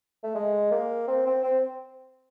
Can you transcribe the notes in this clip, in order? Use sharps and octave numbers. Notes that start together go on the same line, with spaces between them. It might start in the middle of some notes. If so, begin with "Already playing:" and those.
A3
G#3
A#3
C4
C4
C4